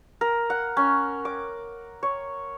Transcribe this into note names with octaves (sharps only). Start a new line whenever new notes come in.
A#4
F#5
C#4
D6
C#5